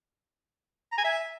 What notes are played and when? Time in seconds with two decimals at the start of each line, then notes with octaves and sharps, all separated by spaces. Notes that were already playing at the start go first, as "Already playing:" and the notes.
0.92 A#5
0.98 G#5
1.04 E5